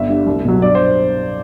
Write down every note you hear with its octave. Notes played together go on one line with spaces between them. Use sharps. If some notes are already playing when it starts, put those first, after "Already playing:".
Already playing: G1 E5
G2 D3 G3
C2
B2 F#3
G2 D5
C5